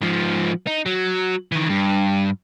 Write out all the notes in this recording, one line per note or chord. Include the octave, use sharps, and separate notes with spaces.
G#2 F3
D#4
F#3
D#3 E3
G2